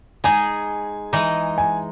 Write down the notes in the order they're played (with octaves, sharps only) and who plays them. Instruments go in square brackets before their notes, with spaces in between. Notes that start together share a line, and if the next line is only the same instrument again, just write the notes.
[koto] G#3 D#4 G#4 [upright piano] G#5
[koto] E3 G#3 D#4
[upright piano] G#5